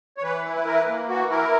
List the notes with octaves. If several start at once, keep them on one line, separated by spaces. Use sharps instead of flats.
C#5
E3 B4
E4
B4
E3 A#4
B4
A#3
E3 F#4
E4 A#4